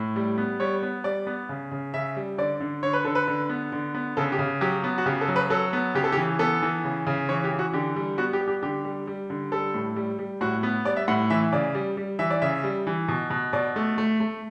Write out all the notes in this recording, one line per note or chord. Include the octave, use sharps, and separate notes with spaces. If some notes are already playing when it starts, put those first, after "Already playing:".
Already playing: A2
G3
B3
G3 C#5
B3
G3 D5
B3
C#3
C#3
C#3 E5
G3
D3 D5
D3
D3 C#5
B4
D3 A4
B4
D3
B3
D3
B3
C#3 A4
G4
C#3
F#3 G4
B3
F#4
C#3 G4
A4
F#3
B4
F#3 A4
B3
C#3 G4
A4
G4
E3
B3 A4
E3
C#3
C#3
E3 C#5
G4
E3
F#4
D3 G4
G3
B3 F#4
G4
G3
G4
D3 G4
G3
G3
D3
G3 A4
A2
G3
G3
A2 F#4
B3
G3 D5
E5
A2 F#5
E3 E5
C#3 D5
G3
G3
E3 E5
D5
C#3 E5
G3
E3
B2
B2
B2 D5
A3
A3
A3